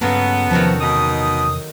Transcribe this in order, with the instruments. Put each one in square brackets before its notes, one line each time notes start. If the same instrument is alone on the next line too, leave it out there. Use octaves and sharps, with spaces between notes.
[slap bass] G2 A#3 [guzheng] C#3 F#3 A4 [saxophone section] B3
[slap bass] E2 C3 [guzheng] D#3 F#4 A4 [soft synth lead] F3
[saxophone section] B2 D#4 [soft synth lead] D#6